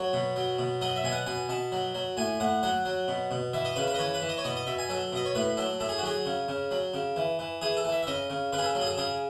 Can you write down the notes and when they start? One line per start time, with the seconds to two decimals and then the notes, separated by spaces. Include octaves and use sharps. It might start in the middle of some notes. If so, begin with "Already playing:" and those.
Already playing: F#3 C#5
0.13 B2
0.36 F#3
0.59 B2
0.81 F#3 D#5
0.96 E5
1.04 B2 G#5
1.12 F#5
1.26 B2 G#5
1.49 B2 A5
1.72 F#3
1.95 F#3
2.17 A2 G#5
2.40 A2 F#5
2.63 F#3 F#5
2.85 F#3
3.08 B2
3.31 B2
3.53 E3 E5
3.65 D#5
3.76 C#3 B4
3.87 B4
3.94 D#5
3.99 E3 C#5
4.14 B4
4.21 E3
4.29 D#5
4.38 C#5
4.44 B2 D#5
4.56 D#5
4.67 B2 E5
4.79 G#5
4.89 F#3 A4
5.12 B2 D#5
5.26 C#5
5.35 A2 B4
5.57 F#3 A4
5.80 A2 A4
5.89 G#4
5.98 F#4
6.03 F#3 G#4
6.26 C#3
6.48 C#3
6.71 F#3
6.94 C#3
7.16 E3
7.39 E3
7.61 E3 G#4
7.77 A4
7.84 E3
7.92 E5
8.03 E5
8.07 C#3 D#5
8.30 C#3
8.53 C#3 B4
8.58 G#4
8.64 A4
8.75 F#3
8.81 G#4
8.86 A4
8.97 C#3 G#4